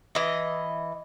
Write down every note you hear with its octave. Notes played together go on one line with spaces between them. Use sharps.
E3 D#5